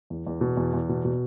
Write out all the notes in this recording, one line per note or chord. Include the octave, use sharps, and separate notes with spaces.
E2
E2
B2
E2
E2
B2
B2